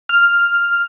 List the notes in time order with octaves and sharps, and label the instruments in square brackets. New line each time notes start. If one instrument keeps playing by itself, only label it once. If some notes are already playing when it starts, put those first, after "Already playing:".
[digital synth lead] F6